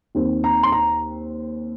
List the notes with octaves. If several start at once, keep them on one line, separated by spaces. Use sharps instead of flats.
D#2 D#3 C4
A#5
C6
A#5